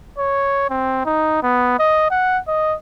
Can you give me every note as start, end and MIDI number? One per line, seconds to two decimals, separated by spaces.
0.18 0.66 73
0.70 1.05 60
1.05 1.38 63
1.43 1.76 59
1.79 2.09 75
2.11 2.39 78
2.48 2.75 75